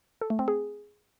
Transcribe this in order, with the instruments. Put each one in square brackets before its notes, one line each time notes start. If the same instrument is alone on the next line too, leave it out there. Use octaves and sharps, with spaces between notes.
[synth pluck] A4
A3
C4
G#4